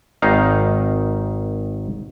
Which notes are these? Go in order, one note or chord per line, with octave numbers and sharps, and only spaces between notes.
G#1 D#3 D#4 F5